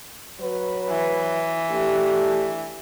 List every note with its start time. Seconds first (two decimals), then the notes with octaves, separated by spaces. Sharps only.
0.41 F#3 B4
0.89 E3
1.70 A3 D4 G4